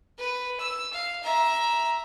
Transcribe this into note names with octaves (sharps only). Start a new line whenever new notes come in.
B4
E6
F5
E5 A#5